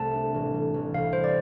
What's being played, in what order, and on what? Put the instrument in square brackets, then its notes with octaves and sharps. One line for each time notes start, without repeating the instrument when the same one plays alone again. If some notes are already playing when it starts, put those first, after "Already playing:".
Already playing: [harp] C2 A3 [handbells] A5
[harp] D4
A1
G3
A1
[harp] C2 [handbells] F5
[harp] G3 [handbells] C5
[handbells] D5